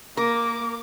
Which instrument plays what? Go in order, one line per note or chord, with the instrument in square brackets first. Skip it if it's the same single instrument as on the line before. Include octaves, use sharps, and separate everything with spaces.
[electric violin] A#3 [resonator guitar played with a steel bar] A#4 [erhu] D6